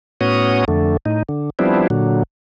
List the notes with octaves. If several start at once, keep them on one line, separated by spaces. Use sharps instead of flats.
A2 B3 C#4 F#4 C#5 D#6
F2 D3 A3
A2 D#4
D3
F3 G3 B3 C4 D4 E4
A#2 D3 F#3